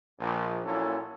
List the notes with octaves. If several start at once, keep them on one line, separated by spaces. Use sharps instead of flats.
A#1
A#2 F#3 A#3 C#4 E4 A4